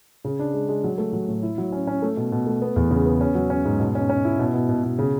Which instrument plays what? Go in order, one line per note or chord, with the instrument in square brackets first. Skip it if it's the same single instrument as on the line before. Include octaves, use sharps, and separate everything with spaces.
[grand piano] C#3
D4
G#3
G#3
F#3
A3
F#3
A2
E4
F#3
C#4
C#4
A3
B2
B2
A3
B3
E2
C#3
B3
C#4
F#3
C#4
G#2
B2
C#4
C#4
E4
B2
B2
B2
B2
C#3